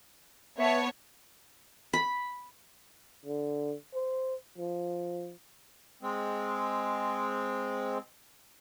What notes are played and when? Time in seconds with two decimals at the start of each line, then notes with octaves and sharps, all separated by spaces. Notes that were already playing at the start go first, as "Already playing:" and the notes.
0.58 B3 C#5 E5 A5
1.93 B5
3.26 D3
3.94 C5
4.58 F3
6.02 G#3 C4